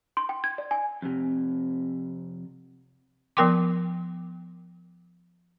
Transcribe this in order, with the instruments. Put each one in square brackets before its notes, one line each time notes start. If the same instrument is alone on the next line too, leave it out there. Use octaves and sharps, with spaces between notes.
[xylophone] C6
G5
G#6
D5
G#5
[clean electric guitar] F2 C3
[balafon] F3 B3 A#4 G5 C6 D6